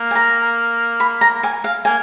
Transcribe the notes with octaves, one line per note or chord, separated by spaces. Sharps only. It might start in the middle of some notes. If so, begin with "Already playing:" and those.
Already playing: A#3
G#5
A#5
B5
A#5
G#5
F5
A#3 G#5